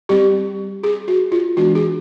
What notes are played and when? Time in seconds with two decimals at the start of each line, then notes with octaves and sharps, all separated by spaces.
0.09 G3 C4 G4
0.83 G#4
1.08 F#4
1.32 F4
1.57 E3 G#3 B3 D4 F#4
1.75 G#4